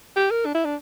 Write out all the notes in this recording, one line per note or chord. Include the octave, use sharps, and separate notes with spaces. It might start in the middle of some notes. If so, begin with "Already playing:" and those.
G4
A#4
D4
E4
D4